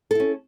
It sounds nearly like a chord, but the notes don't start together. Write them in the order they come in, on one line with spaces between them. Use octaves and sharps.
A4 E4 C#4